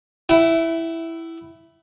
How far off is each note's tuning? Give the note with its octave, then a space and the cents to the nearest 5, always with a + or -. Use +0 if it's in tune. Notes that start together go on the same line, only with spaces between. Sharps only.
E4 +0 F#5 +45